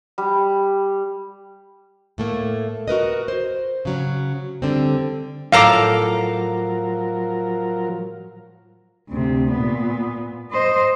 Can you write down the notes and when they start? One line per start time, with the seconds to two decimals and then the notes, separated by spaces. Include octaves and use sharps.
0.18 G3
2.18 A2 A3 A#3
2.88 F#4 A#4 B4 D#5
3.28 C5
3.85 C#3 F#3 C#4
4.62 D3 G3 C4
5.52 A2 F3 F#3 A4 A#4 F5 A#5 D6
9.10 D2 C3
9.52 A#2 B3
10.51 C5 D#5